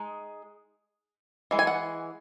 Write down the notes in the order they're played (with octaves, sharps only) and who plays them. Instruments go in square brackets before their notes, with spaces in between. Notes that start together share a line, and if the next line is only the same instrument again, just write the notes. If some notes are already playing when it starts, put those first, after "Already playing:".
Already playing: [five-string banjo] G#3 D#4
E3 G#3
G#5
F#5